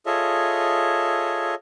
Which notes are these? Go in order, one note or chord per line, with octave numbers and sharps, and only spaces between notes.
F4 G#4 A4 C#5 D#5 E5